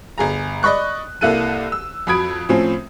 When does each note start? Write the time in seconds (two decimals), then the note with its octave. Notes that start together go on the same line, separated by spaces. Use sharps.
0.18 G1 G#4 A#5
0.63 D5 D#5 B5 C#6 F#6
1.21 C2 A#3 E4 A4 F#6 D#7
1.72 E6
2.07 F2 F#4 B5 D#6 G#6 D7
2.49 A2 F3 C4 C#4